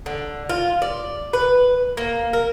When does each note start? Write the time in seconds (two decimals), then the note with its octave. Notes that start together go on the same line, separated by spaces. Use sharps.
0.06 D3
0.49 F4
0.82 D5
1.33 B4
1.97 A#3
2.33 A#4